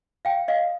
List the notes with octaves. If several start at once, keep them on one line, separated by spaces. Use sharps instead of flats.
F5 G5
D#5 F5